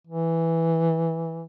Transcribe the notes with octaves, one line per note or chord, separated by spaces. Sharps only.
E3